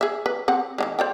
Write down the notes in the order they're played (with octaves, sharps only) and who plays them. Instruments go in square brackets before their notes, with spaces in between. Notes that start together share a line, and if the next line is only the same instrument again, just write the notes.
[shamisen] G#4 E5
B4
C4 F#5
D#3 F#3 G#3
C5 D5 G5